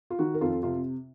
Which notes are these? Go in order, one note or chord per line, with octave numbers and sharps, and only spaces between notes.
F4
D#3 F#4
A#4
F2 F4 A4
C3 F4